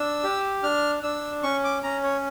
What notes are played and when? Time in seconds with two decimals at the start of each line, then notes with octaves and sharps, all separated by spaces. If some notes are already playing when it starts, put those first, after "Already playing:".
Already playing: D4 E6
0.24 G4
0.63 D4 F6
1.03 D4 E6
1.43 C#4 C#6
1.64 D6
1.83 C#4 A#5
2.03 C#5